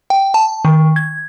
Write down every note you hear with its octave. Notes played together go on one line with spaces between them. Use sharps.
G5
A5
D#3
G#6